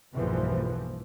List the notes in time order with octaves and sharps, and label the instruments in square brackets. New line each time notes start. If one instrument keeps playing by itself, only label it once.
[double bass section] B1 E2 G2 E3 F3 A#3